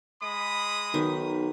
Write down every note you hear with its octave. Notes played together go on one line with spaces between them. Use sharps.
G#3 B5 D#6
B1 D#3